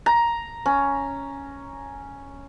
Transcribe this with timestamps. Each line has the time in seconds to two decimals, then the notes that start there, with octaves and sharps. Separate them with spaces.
0.06 A#5
0.66 C#4